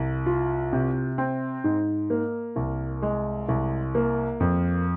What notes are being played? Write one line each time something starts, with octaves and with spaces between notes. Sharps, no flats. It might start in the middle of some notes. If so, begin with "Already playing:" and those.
Already playing: C2
F4
C3
C4
G#2
A#3
C2
G#3
C2
A#3
F2